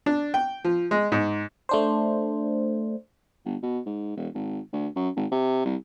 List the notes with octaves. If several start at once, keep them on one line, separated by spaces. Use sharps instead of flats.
D4
G5
F3
G#3
G#2
A3 D4 C5
G1
B2
G#2
E1
G#1
D2
F#2
G#1
C3
C2